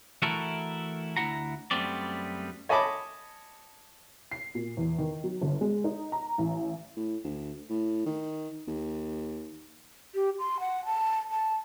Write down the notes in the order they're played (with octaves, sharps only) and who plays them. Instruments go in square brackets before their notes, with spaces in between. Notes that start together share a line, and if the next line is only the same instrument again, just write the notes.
[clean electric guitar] E3 A3 E4 F#4 A4 A#4
D2 E4 F#5 A#5
F#2 G3 A3 B3 C4 D5
[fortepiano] C#5 D#5 G#5 A5 B5 D6
[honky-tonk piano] C7
A#2
E2
D#3
F#3
G1
G#3
D#4
A#5
A1
[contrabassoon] A2
D2
A2
D#3
D#2
[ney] G4
C6
F#5
A5
A5